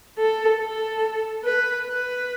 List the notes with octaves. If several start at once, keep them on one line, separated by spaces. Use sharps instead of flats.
A4
A4
B4
B4